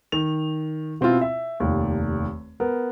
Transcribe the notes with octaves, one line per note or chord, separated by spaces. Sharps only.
D#3 F7
B2 C4 E4 F4
E5
F1 D#2
B3 A#4